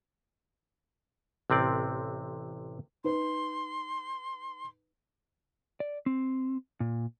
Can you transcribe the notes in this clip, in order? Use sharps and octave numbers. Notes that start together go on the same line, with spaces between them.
A1 C3 C4 D5
D#4 B4 C6
D5
C4
A#2